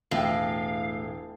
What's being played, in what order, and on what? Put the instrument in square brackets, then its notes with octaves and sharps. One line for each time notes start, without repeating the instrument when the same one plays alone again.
[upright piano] E1 G5 [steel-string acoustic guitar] A2 [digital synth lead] F5